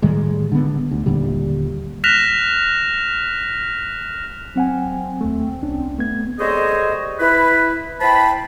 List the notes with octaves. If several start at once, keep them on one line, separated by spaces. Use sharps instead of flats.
A2 D#3 G3 G#3
D3 B3
D2
D#1 A#2 D3 G3
F6 F#6 A#6 B6 E7 F7
F#3 C4 F#5 G#5
D#2 A3
C2 C#4 D4
A3 B3 G#6
G3 G#4 A4 C5 C#5 D#5
E4 B4
E4 C5 G5 A5 B5